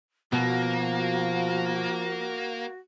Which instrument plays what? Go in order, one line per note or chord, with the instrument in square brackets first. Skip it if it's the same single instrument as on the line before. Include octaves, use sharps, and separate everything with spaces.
[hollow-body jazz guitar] B2 [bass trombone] F3 [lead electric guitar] A#3 [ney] F#4